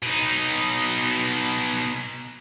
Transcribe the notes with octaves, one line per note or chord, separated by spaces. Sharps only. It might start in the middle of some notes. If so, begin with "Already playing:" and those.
B2 D#4